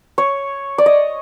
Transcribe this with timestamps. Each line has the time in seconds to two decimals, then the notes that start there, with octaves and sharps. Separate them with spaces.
0.18 C#5
0.78 D5
0.86 D#5